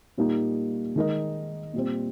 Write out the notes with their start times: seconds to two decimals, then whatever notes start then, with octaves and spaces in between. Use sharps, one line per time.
0.18 A#2 G3 A#3 D#4
0.96 D#3 G#3 D#4 A#4 D#5
1.74 A#2 G3 C4